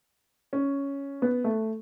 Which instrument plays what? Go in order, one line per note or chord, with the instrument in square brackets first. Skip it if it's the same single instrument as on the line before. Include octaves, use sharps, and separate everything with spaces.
[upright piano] C#4
B3
A3